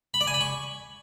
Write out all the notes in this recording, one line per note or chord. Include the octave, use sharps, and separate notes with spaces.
B5
D5
G#5
B5
C#6